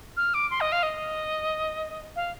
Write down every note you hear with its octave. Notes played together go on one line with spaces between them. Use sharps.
F6
D6
C6
D#5
F5
D#5
F5